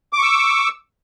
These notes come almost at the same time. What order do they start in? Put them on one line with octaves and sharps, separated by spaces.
D6 C#6 E6